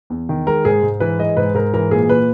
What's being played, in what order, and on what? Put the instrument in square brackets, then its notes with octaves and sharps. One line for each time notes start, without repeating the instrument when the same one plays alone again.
[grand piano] E2
D#3
G#3 A#4
G#2 G#4
G#2
E3 B4
G#3 D#5
G#2 B4
G#2 A#4
E3 A#4
A#2 G#4
A#2 B4